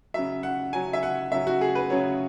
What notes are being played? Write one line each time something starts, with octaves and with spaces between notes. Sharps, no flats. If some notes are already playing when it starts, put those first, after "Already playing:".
C#3 F#3 E5
F#5
C#3 F#3 G#5
E5
F#5
C#3 F#3 E5
F#4
G#4
B4
C#3 F#3 C#5